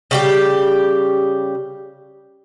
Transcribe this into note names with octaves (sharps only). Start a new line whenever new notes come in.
C#3 G3 G4